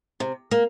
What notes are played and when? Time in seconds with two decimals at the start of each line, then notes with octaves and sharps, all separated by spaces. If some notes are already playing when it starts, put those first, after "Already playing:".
0.20 C3
0.51 A#3